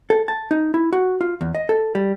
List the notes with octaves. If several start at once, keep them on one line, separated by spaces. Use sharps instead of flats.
A4
A5
D#4
E4
F#4
F4
E2
D#5
A4
G3